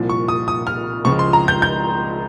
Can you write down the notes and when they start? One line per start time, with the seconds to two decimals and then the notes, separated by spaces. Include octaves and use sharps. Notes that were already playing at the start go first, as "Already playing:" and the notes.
Already playing: C2 A#2 F3
0.09 C#6
0.28 D#6
0.48 D#6
0.67 F6
1.05 C#2 C#3 F3 G#3 C#6
1.19 C6
1.33 A#5
1.48 G6
1.62 G6